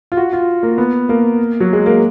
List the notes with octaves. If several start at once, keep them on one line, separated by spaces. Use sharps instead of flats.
F4
F#4
F4
A#3
B3
A#3
F#3
G#3
A#3